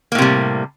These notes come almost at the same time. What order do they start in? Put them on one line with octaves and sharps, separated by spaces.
A#3 A2 C3 G3